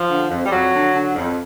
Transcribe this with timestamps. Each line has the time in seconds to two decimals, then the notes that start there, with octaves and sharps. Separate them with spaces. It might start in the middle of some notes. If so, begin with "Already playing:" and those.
Already playing: F3
0.10 D3
0.31 F2
0.46 G3
0.51 F2 F#3
0.73 D3
0.94 D3
1.15 F2